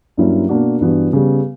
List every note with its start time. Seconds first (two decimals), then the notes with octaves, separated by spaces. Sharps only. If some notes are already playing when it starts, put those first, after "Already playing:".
0.17 G2 F#3 A#3 C#4 E4
0.49 B2 A#3 D4 F#4
0.81 G2 E3 B3 D4 F#4
1.13 C#3 G3 B3